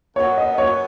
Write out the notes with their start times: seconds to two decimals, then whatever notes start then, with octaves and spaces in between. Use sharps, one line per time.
0.16 F#2 F#3 B3 C#5
0.37 D#5
0.58 C#5